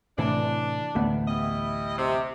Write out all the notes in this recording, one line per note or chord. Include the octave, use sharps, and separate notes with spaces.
A2 C3 E3 D4
A1 D2 B3
G3 E4 D#5
C3